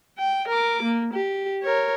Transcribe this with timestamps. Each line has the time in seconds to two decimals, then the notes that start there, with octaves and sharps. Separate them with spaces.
0.19 G5
0.48 A#4 D6
0.83 A#3
1.14 G4
1.63 A#4 C#5